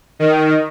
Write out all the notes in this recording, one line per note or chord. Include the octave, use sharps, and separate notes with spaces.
D#3